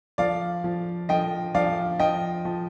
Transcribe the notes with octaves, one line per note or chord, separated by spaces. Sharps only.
F3 D5 F5
F3
F3 D#5 G5
F3 D5 F5
F3 D#5 G5
F3